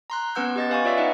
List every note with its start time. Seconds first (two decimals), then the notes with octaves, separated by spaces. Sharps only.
0.10 A#5 C6 F#6
0.35 B3 C#4 B4 F#5 E6 G6
0.56 G4 D#5 A6
0.70 B4 F5 G#5 C#6
0.84 F4 C#5 D5 E5 E6
0.97 D#4 B4 D#5 E5 F#5